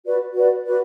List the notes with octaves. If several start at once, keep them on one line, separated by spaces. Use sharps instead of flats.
F#4 B4 D5
F#4 B4 D5
F#4 B4 D5